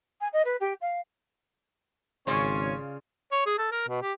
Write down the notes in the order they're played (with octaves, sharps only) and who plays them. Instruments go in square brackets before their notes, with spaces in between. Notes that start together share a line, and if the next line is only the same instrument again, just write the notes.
[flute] G#5
D#5
B4
G4
F5
[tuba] G#1 [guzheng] C#3 F4 D5 [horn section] C#4 C#5
[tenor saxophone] C#5
G#4
A4
A#4
B2
G4